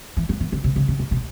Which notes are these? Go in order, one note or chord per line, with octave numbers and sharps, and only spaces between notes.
E3
F3
E3
D3
C3
C#3
C#3
C3
B2